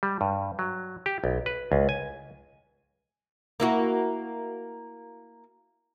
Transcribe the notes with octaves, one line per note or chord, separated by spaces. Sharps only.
G3
G2
F#3
G4
B1
B4
C#2
G#5
A#3 E4 F#4